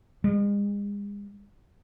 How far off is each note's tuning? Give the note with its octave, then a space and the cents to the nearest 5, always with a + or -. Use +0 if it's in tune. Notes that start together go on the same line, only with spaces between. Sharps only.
G#3 -40